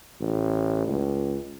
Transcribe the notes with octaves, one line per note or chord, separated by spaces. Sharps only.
A1
C#2